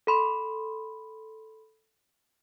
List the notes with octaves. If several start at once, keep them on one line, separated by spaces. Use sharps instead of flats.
A4 B5 C6